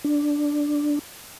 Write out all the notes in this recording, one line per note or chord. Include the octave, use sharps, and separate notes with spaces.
D4